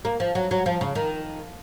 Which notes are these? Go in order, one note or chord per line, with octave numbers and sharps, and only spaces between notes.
A#3
F3
F#3
F#3
F3
C#3
D#3